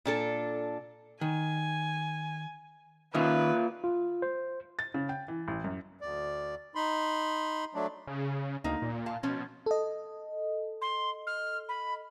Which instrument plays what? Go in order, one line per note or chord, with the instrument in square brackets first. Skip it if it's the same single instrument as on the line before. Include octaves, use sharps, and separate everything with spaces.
[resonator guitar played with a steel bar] A#2 D4 A4
[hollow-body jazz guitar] D#3 [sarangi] G#5
[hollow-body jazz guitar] D#3 C#4 [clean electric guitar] A#3 F4 E5 [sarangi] B4
[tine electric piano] F4
C5
[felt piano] A6
C#3
G5
E3
A1
F#2
[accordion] D2 D5
D#4 B5 C6
F#3 A3 D4
[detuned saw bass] C#3
[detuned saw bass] D2 [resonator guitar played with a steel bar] A#3 D#4
[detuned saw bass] A#2
[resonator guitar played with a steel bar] F5 A5
[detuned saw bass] B2 [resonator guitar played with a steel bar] F3 C#4 F4
[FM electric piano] A4 D#5
[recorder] C6
F6
B5